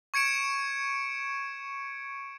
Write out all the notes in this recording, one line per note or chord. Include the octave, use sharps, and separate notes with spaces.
C#6 G#6 C#7 D7 E7